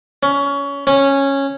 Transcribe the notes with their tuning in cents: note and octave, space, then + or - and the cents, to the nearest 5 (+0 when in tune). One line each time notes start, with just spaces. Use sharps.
C#4 +20
C#4 -10